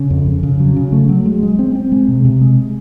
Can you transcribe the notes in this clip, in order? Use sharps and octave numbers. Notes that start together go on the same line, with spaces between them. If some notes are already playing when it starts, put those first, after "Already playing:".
Already playing: C#3
F2
F2
C#3
F#3
C#3
A3
F#3
G#3
G#3
C4
C4
G#3
C3
C3
G#3